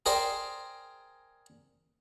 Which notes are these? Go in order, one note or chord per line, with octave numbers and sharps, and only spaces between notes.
G#4 A#4 C5 D5 G5